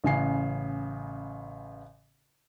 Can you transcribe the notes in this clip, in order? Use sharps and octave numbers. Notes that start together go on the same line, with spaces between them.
A1 C#3 G#5 C7